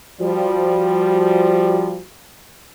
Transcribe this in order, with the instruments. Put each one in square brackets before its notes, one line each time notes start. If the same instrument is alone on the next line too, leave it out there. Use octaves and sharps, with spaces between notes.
[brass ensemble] F3 G3 [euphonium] F#4